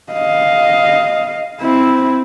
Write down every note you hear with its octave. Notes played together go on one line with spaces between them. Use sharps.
D#5 F5
C4 E4